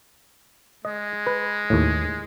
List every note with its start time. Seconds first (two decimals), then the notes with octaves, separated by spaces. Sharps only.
0.85 G#3 D#5
1.27 B4
1.70 D#2 A2